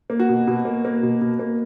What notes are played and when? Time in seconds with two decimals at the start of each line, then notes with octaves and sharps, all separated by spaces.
0.10 A#3
0.19 F#4
0.29 B2
0.47 B2
0.65 A#3
0.85 A#3
1.03 B2
1.21 B2
1.39 A#3